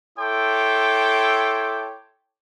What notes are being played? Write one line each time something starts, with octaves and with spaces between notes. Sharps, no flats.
E4 A4 C#5 G5 C6 D6